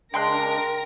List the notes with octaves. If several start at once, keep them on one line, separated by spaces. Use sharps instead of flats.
C#3 G#3 D4 A#4 G5 C6 F#6 A#6